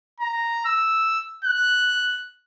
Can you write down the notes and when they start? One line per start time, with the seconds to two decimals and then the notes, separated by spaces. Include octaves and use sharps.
0.20 A#5
0.65 E6
1.44 F#6